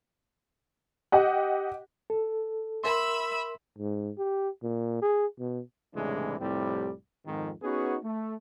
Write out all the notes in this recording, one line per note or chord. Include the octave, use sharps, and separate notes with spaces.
G4 D#5 F#5
A4
A#4 E5 B5 C6 E6
G#2
G4
A#2
G#4
B2
C2 A2 C#3 E3 G#3 D4
C2 F2 A2 G3 C4 G4
F2 G#2 D#3
B3 C#4 D#4 F#4 G#4 B4
A3